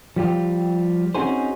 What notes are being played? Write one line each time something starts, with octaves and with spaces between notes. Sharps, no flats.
F3 G3 F4 G4
C4 C#4 D#4 F#4 G#4 C5